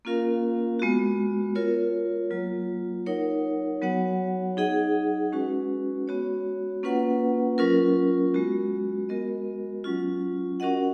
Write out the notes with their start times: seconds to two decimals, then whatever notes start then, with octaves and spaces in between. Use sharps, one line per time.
0.05 A#3 C#4 F4 A#4 F5
0.79 G#3 B3 F#4
1.55 F4 A#4 C#5
2.31 F#3 A#3 F4
3.06 D#4 A#4 C#5 F#5
3.82 F#3 B3 F#4 C#5 F#5
4.57 D#4 G#4 D#5 F#5
5.32 G#3 C#4 F#4 B4
6.08 G#3 B3 F#4 C#5
6.83 A#3 C#4 F4 B4 F#5
7.58 F#3 C#4 F4 A#4
8.34 G#3 B3 F#4
9.09 G#3 B3 F#4 A#4 D#5
9.84 F#3 C#4 F4
10.60 C#4 F#4 A#4 D#5 F#5